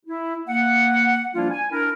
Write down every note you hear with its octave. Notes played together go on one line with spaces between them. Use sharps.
E4
A#3 F#5
F3 G3 A#3 D4 E4 F4
G#5
D4 E4 A#4